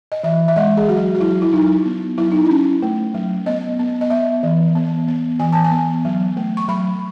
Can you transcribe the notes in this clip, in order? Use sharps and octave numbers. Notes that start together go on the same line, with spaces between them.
D#5
E3 E5
E5
G#3 D#5
G#4
F#3 F#4
F#4
F#3 E4
E4
F#3 D#4
B3
F#3 E4
D#4
C#4 E4
A3
F#3
B3 D#5
B3
D#5
B3 E5
E3
B3
B3
E3 G#5
A5
G#5
B3
F#3
A3
C#6
F#3 B5